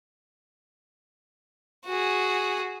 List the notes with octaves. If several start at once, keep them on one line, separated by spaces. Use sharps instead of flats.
F#4 G#4